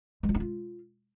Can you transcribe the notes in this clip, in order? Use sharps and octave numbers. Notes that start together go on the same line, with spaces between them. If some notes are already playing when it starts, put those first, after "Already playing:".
G#3
F4
D#4
F4